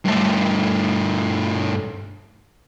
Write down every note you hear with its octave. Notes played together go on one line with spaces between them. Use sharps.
G2 A3